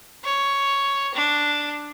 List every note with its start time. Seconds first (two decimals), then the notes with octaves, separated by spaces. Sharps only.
0.24 C#5
1.15 D4